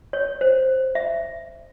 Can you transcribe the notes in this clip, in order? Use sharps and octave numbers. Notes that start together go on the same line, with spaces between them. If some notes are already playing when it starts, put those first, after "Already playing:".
C#5
C5
E5